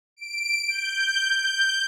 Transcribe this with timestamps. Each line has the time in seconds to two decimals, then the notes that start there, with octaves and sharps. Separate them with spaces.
0.17 D7
0.69 G6
1.35 G6